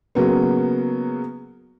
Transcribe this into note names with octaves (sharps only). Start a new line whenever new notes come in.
C#3 F#3 A#3 B3